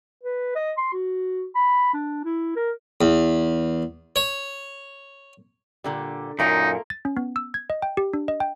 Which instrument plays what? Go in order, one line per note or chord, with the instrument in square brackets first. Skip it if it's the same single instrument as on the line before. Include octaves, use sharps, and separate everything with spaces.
[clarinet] B4
D#5
C6
F#4
B5
D4
E4
A#4
[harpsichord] E2
C#5
[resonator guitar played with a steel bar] A#2 D3 G3
[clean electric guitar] F#2 A#2 [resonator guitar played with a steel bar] A3 A#3 F4 [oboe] D#4
[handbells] A6
C#4
B3
E6
G#6
D#5
G5
G4
D4
D#5
G5